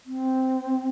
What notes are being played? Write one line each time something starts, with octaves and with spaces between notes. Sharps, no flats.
C4